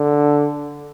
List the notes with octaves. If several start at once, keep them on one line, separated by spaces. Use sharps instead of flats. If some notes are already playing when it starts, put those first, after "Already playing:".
Already playing: D3